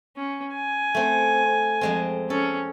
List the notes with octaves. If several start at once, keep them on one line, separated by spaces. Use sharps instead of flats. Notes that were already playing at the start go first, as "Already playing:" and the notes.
C#4
G#5
A3 C4
F2 G#3 C4
C#4 A4